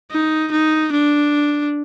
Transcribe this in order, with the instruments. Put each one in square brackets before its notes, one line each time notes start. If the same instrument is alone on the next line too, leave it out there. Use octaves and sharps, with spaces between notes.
[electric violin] D#4
D#4
D4